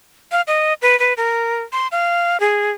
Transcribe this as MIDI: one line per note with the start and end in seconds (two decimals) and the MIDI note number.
0.32 0.41 77
0.47 0.73 75
0.82 0.99 71
1.00 1.13 71
1.17 1.62 70
1.72 1.87 84
1.92 2.40 77
2.40 2.72 68